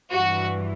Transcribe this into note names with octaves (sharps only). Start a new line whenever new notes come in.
G2 E3 F#4